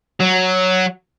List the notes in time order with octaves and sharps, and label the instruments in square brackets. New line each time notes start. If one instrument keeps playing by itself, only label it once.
[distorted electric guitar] F#3